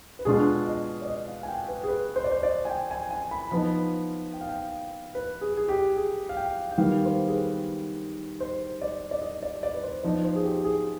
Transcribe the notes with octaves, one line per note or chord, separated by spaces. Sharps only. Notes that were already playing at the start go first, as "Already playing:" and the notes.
B4
B2 G#3 D4 F4 G#4
D#5
D5
D#5
F5
G#5
G5
B4
G#4
B4
C5
D5
C5
D5
G#5
G5
G#5
G#5
B5
F3 B3 D#4 B5
G5
F5
G5
B4
G#4
G#4
G4
G#4
F5
G5
G5
D#3 G3 B3 F5
C5
G#4
B4
C5
D5
D5
D#5
D5
D5
B4
C5
F3 B3 D#4 D5
C5
G#4
G4
G#4